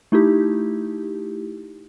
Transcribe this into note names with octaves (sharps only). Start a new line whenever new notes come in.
A3 D#4 E4 G4